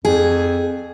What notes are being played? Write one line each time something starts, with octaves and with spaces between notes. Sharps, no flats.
F2 G#4